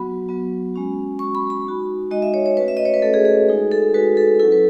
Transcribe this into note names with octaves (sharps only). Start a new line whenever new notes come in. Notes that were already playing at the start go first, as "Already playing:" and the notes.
Already playing: F#3 B3 F#4 B5
F#3 B3 F#4
G#3 C#4 F#4
G#3 C#4 F#4 C#6
B5
B5
G#3 D#4 F#4
G#3 D#4 F#4 D#5
E5
C#5
C#5
A3 C#4 F#4 B4
E5
D#5
C#5
B4
A3 C#4 F#4 A4
G#4
G#4
G#3 D#4 F#4 G#4
A4
G#3 D#4 F#4 B4
A4
F#3 C#4 E4 A4
B4